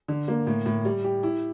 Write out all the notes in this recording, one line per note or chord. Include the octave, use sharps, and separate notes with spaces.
D3
A#3
A2
A2
G3
G4
E4